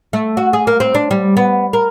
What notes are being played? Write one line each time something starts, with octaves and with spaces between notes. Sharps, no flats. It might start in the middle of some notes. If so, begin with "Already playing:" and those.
A3
F#4
G#4
A#3
C4
D4
G3
B3
A#4